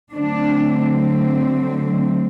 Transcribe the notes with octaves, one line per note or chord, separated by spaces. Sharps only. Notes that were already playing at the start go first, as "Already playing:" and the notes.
D3 F#3 A3 C4 D4